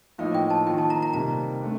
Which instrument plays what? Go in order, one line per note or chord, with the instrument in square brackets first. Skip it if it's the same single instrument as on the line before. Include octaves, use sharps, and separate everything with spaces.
[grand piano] A2 F3 A#3 D#4 [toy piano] F5
[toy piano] G5
A5
[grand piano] D#3 A#3 F4 [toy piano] G5
[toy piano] A5
A#5
A#5
[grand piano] C3 D#3 G3 A#3 [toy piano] A#5
[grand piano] A3 D4